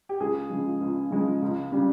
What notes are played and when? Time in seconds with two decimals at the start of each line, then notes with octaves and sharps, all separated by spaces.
0.09 G4
0.20 C#2 G#4
0.50 C#3 F3 G#3
0.81 C#2
1.11 C#3 F3 G#3
1.42 C#2
1.72 C#3 G3